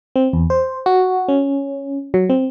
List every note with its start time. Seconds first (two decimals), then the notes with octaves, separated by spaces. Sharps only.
0.16 C4
0.33 E2
0.50 C5
0.86 F#4
1.28 C#4
2.14 F#3
2.30 C4